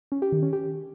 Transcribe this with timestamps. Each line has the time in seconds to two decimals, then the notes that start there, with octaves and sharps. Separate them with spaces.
0.12 C#4
0.22 G4
0.32 D#3
0.43 C#4
0.53 G4